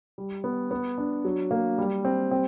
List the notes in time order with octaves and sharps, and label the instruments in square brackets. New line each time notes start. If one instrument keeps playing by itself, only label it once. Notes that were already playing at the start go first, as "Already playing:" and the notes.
[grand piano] G3
B3
B3
D4
F#3
A#3
G3
C4
C4